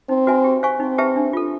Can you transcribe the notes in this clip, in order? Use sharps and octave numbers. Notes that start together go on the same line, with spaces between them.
C4 D#4
F#4 B4 E5 G#5
G4
C5 F5 G#5 C#6
C4 D#4
G4 B4 E5 A5
D4
F4 A4